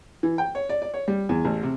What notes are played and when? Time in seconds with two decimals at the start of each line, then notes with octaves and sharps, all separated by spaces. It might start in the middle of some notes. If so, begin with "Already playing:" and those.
0.23 E3
0.38 G5
0.55 C#5
0.69 D5
0.82 D5
0.94 C#5
1.08 G3
1.29 E2
1.45 A1
1.63 C3